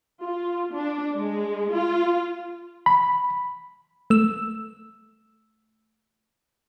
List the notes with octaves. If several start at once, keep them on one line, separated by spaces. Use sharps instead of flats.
F4
D4
G#3
F4
B5
A3 E6